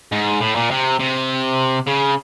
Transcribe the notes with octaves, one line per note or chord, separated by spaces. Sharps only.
G#2
A2
A#2
C3
C3
C#3